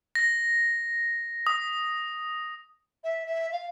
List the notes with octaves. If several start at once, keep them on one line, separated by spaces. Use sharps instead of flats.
A#6
D#6
E5
E5
F5